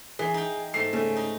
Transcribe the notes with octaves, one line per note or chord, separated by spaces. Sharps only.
E3 G#4
D#4 G5
G#2 A3 C7
C#3 A3
D#4